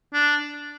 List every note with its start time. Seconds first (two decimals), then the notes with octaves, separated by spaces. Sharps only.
0.14 D4